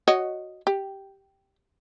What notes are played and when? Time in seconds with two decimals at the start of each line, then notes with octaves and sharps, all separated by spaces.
0.08 F#4 C#5 D#5
0.67 G4